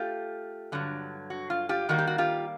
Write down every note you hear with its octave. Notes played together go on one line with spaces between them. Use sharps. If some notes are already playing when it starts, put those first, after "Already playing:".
Already playing: A3 F4 G4
G2 D3 F#3
F#4
F4
F4 G4
D#3 G3 A#3 F#4
G4
F#4
F4 G4